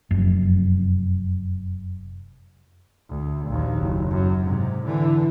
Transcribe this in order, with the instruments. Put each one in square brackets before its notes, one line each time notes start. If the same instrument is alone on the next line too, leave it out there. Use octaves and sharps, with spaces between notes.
[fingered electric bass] F1 F#2
[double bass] D2
A#1 D#2
F#1
F#2
G#2 C3
D3 E3